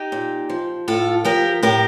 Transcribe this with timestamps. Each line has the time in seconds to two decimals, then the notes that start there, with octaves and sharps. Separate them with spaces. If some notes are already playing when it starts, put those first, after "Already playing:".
Already playing: D#4 G4
0.12 A#2
0.50 F3
0.88 A2 F4 A4
1.25 F3 G4 A#4
1.63 A2 G4 A#4